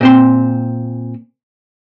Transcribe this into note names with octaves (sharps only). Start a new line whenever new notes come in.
A#2 C4 C6